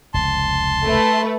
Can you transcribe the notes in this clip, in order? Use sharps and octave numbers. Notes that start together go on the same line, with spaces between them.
F1 C#2 A5 C6
A3 B4